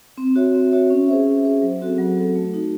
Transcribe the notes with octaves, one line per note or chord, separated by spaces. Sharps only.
C4
F#4 C#5 E5
C4
F#4 C#5 E5
C#4
G#4 C5 E5
C#4
G#4 C5 E5
F#3
C4 F#4 A4
F#3
C4 F#4 A4
A3
D#4 F#4